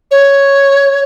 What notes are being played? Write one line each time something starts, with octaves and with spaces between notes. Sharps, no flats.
C#5